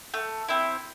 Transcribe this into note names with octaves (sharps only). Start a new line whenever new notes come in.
A3
C4 E4